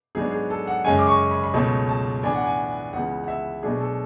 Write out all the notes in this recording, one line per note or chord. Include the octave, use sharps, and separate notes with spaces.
G#2 F#3 B3 D4 G#4
G#4
A4
F#5
F#2 C#3 G#3 C#4 G#5
D6
C#6
B5
B5
C#2 B2 F#3 A3 C#4 A5
A5
A2 E3 B3 D4 G#5
F#5
G#5
C#2 C#3 E3 B3 F#5
F#5
E5
B2 F#3 A3 D4 G#4
A4